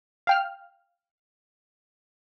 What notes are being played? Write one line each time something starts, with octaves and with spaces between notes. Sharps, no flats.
F5 G5 F6